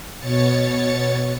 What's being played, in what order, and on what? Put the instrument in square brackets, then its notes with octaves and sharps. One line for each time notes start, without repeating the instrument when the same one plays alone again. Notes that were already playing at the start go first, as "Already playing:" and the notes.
[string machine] B2 C#5 A6 C#7